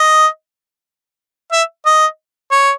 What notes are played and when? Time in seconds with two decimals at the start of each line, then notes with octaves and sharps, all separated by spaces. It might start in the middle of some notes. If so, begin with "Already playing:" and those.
Already playing: D#5
1.52 E5
1.86 D#5
2.51 C#5